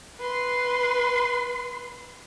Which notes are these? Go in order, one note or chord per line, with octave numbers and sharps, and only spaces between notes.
B4 C6